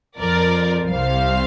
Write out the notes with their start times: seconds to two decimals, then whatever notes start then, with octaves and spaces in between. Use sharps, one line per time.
0.18 F2 F3 A#4 D5
0.91 C2 C3 G3 C5 F5